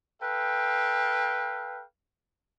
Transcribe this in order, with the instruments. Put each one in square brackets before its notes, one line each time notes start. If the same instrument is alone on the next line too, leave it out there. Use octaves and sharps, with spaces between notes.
[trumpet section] A4 B4 F5 G5